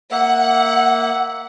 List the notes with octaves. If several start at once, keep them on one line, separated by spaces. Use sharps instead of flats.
A#3 E5 F#5